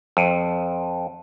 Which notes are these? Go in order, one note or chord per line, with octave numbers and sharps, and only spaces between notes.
F2